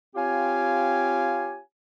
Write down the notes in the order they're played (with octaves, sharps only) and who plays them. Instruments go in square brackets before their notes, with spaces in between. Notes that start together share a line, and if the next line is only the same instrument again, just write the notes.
[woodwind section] C4 F4 G4 C#5 F5 G#5